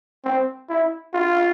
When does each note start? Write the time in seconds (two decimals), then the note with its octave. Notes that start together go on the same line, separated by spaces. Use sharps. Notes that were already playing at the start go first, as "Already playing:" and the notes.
0.24 C4
0.69 E4
1.14 F4